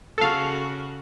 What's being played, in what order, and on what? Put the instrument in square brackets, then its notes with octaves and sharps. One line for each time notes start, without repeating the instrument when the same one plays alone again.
[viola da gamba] C#3 F#4 [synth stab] A4 F5